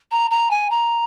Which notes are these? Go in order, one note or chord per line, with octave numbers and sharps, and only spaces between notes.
A#5
A#5
G#5
A#5